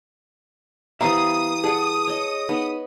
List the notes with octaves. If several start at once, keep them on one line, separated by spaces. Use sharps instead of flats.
E3 G3 B3 C5 E5 F5 A#5 D#6
G#4 D5 F#5 A5
C#5 D#5
B3 D#4